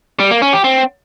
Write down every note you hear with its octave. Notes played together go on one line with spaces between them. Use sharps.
G3
A#3
C#4
G4
C4